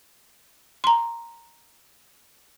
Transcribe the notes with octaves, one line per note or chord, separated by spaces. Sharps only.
A#5 C6